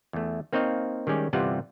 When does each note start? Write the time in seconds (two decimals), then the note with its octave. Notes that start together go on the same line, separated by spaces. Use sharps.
0.13 E2 A3
0.53 A#3 C4 D#4 C#5 D#5 F5
1.07 D#3 G3 G#3 C#4 D5
1.33 G1 C3 E3 G3 F4 F#5